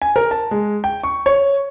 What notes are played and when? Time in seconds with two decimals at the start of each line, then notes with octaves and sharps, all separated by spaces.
0.02 G#5
0.16 A#4
0.31 A5
0.51 G#3
0.84 G5
1.03 C#6
1.26 C#5